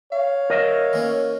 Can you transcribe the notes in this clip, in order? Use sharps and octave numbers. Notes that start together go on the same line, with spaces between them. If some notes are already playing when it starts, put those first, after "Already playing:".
C#5 F5
A#4 D#5 E5
E3 A#3 C#4